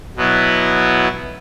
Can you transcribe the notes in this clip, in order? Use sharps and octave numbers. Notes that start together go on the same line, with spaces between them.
B2 F#3 B3 E4